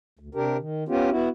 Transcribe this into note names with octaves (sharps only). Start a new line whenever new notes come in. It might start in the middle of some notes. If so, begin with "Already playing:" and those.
D2
C3 D4 G4 A#4
D#3
B3 C#4 F4 G4
B3 E4 F#4